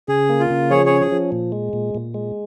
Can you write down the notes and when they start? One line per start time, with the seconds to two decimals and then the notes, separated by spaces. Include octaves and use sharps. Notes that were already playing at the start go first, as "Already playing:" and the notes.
0.08 C#3 G#4
0.29 A#3
0.40 F4
0.50 C#3
0.70 F3 G#4 C#5
0.86 C#4 G#4 C#5
1.01 G#4
1.12 F3
1.32 A#2
1.52 G#3
1.73 A#2
1.95 A#2
2.14 G#3